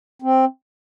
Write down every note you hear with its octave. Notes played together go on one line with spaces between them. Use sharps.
C4